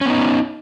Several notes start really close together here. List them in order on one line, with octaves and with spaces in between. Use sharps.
C#4 B3 D#4